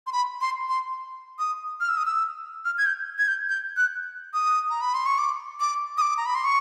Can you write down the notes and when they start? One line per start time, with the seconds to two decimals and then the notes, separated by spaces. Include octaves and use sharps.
0.07 C6
0.13 B5
0.41 C6
0.69 C6
1.39 D#6
1.80 F6
1.89 E6
1.97 D#6
2.06 E6
2.65 F6
2.78 G#6
2.86 G6
3.18 G#6
3.28 G6
3.49 G6
3.77 F#6
4.33 D#6
4.70 A#5
4.81 B5
4.94 C6
5.06 C#6
5.18 D6
5.60 D6
5.98 D#6
6.01 D6
6.18 A#5
6.26 B5
6.35 C6
6.45 C#6